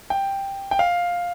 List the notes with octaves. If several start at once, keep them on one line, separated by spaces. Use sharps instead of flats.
G5
G5
F5